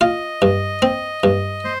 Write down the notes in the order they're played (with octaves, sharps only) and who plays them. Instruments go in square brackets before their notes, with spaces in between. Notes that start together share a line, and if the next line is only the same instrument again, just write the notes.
[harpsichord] F4 [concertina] D#5
[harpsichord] G2
C4
G2
[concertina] C5